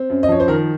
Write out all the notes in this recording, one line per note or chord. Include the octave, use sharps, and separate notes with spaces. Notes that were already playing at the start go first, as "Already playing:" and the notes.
Already playing: C4
F#2
D#5
F3 C#5
C5
D#3 A#4